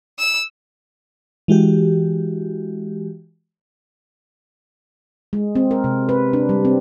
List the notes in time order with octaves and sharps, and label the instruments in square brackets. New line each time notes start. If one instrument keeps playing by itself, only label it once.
[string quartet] E6
[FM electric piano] E3 G#3 F#4 G4
[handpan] G#3
C4
A#4
C3
B4
D4
G3
C4